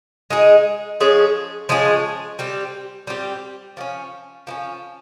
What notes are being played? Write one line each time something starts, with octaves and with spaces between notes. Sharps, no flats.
G#3 D#4 G#4
F3 G#3 C#4 G#4
F3 G#3 C#4 G#4
G3 C4 G4
G3 C4 G4
F3 A#3 C#4
F3 A#3 C#4